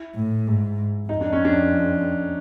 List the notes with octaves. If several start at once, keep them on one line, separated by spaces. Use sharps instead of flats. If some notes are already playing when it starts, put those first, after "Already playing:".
Already playing: E4
A2
G#2
F2 D#4
D4
C#4
D4